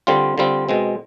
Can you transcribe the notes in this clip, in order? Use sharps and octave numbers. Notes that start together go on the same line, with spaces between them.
D3 G3 C4 F4
D3 G3 C4 F4
B2 G#3 C4